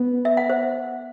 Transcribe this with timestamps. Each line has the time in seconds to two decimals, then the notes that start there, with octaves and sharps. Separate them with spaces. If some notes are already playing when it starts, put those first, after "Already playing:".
Already playing: B3
0.25 E5
0.37 F#5
0.49 C5